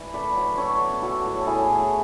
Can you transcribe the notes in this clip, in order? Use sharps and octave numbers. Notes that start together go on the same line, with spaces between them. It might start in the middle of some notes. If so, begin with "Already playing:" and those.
Already playing: E3 D4 E4
A3 B4 D5
F#3
D4 A4 C#5
B3
F#3 F#4 A4
A2
A4
A2 E4 G#4
A3